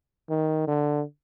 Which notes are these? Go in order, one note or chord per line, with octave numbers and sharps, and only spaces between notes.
D#3
D3